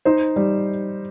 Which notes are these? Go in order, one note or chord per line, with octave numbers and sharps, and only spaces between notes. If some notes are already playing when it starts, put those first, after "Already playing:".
D#4 C5
G3